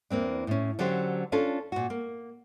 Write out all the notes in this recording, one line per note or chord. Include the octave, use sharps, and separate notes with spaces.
E2 A#3 C4 D4
A2 C#4
D3 F#3 C#4 G4 C5
C#4 D4 F4 A4
A#2 F#4
A#3